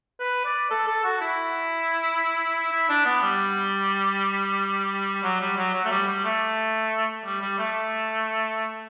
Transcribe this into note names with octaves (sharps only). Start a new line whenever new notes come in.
B4
D5
A4
A4
F#4
E4
E4
D4
B3
G3
F#3
G3
F#3
F#3
A3
G3
G3
A3
G3
G3
A3